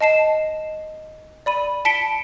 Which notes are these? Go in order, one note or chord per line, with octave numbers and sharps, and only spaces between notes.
D#5 A5 C7 E7
D5 B5 D#7
A5 B6 C#7 D7 G7